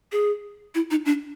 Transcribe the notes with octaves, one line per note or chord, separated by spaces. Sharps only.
G#4
E4
D#4
D4